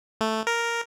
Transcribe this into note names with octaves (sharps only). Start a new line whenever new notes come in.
A3
A#4